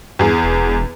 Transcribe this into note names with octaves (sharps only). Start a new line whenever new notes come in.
E2 G2 G#4
E1